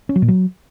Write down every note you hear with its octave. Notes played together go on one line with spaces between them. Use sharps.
C#4
F#3
A#2
F#3